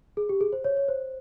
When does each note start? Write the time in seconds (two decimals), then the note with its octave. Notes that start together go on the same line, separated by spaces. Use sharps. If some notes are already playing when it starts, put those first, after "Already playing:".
0.17 G#4
0.29 G4
0.41 G#4
0.53 C5
0.64 C#5
0.77 C#5
0.88 C5